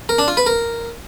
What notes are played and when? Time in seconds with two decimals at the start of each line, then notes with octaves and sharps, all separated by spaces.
0.09 A#4
0.19 D4
0.28 F4
0.37 B4
0.47 A#4